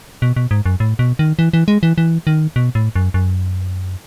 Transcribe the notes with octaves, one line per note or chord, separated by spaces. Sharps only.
B2
B2
G#2
F#2
A2
B2
D#3
E3
E3
G#3
E3
E3
D#3
B2
A2
F#2
F#2